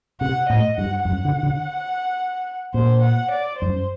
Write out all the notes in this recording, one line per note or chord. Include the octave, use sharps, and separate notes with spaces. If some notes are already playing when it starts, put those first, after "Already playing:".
C3 F#5
A2 D#5
G2 F#5
F#2 F#5
D3
D3
A#2 C5
F#5
D5
F#2 C5